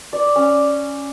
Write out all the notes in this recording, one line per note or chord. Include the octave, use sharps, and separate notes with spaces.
D5
C#4